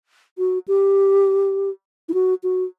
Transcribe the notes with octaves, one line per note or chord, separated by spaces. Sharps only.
F#4
G4
E4
F#4
F#4